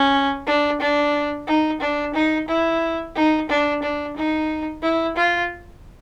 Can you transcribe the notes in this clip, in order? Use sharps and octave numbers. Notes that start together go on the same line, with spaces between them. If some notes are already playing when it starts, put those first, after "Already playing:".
Already playing: C#4
D4
D4
D#4
D4
D#4
E4
D#4
D4
D4
D#4
E4
F4